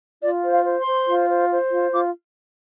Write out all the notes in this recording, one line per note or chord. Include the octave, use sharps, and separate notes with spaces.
F4 D5
C5
F5
C5
C6
C5
F4
C5
C5
F4
F4 D6